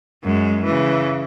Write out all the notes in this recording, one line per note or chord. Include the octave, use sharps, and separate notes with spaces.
F#2 G#3
C#3 E3